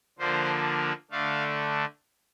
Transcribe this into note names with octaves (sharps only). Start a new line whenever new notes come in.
D3 F3 A#3 D4 C5
D3 A3 D4 F5